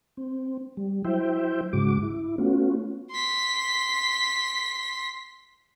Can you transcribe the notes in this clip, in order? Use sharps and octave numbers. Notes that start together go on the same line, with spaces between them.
C4
G3
F#3 E4 C5 E5 G5
G#2 C#3 G#3 F#4 D6
E4
A3 B3 C#4 F4 F#4
C6 B6